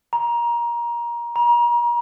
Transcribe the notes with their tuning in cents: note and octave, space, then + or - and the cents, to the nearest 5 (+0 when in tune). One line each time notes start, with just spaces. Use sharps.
A#5 +20
A#5 +35